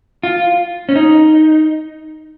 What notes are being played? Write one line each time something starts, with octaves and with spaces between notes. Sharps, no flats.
F4
C#4
D#4